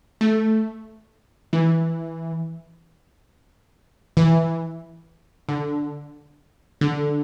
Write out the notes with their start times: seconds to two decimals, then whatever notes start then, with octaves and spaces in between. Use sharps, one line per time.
0.21 A3
1.53 E3
4.17 E3
5.49 D3
6.81 D3